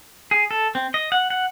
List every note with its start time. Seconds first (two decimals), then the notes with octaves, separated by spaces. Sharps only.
0.31 G#4
0.51 A4
0.75 C4
0.94 D#5
1.12 F#5
1.30 F#5